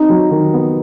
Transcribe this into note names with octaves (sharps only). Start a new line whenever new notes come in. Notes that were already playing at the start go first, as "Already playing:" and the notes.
Already playing: C4 D#4
F#3
D#3
B3